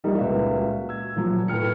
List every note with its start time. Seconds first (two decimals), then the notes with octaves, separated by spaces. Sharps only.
0.04 F3 G3 A#3 D#4 E4 D5
0.18 C#2 A#2 B4 E5 F5
0.59 F#4
0.89 E6 G#6
1.16 A#2 F3 F#3
1.48 A2 B4 G5 F6 C#7